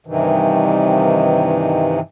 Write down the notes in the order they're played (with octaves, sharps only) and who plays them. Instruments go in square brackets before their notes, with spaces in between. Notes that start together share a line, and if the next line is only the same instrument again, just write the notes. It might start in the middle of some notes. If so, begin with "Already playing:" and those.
[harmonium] G2 C3 D#3 E3